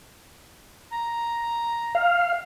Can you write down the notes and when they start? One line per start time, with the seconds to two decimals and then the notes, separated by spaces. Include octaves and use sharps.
0.91 A#5
1.95 F5